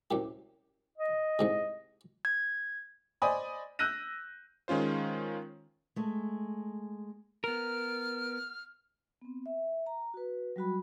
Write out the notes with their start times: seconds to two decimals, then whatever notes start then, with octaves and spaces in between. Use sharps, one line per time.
0.11 C2 F#2 G4
0.98 D#5
1.39 C2 G#2 C3
2.25 G#6
3.22 C5 D5 D#5 G#5 B5 D#6
3.79 E6 F#6 G6 A#6 D#7
4.68 D#3 G#3 C#4 F4 C5
5.96 G#3 A3
7.44 B3 A#4 F6
9.22 B3 C4
9.46 E5
9.86 A#5
10.14 F#4 B4
10.56 F#3 G3 F#4 B5